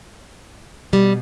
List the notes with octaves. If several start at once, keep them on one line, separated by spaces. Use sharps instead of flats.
B2 G3